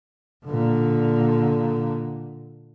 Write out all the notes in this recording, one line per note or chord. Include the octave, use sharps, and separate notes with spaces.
A#2 D3